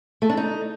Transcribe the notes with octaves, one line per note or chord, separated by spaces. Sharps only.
A3
D4
D#4